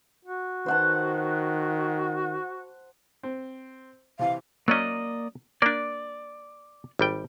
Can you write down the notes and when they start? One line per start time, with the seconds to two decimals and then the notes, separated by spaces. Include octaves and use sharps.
0.25 F#4
0.66 D#3 C5 F#5 A5
3.23 C4
4.19 C3 E3 F5
4.68 F#3 A#3 C#4 D5 D#5
5.62 A#3 D4 D5
6.99 G#1 G3 G5